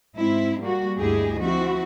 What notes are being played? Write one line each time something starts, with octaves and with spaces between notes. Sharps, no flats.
G#2 C4 E4
G3 A#3 F#4
D2 G2 E4 G4 G#4 D#5
F3 C4 E4 F#4